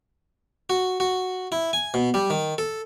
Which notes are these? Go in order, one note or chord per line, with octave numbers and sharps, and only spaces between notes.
F#4
F#4
E4
G#5
B2
G3
D#3
A4